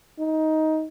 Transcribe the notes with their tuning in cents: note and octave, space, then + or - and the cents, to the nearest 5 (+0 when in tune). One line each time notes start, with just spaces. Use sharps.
D#4 +15